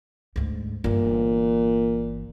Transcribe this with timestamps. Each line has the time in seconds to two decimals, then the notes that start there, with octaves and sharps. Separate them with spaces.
0.36 D2 G#2
0.84 G1 A#2 E3